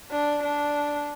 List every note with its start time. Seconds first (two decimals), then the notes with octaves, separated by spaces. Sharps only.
0.11 D4
0.43 D4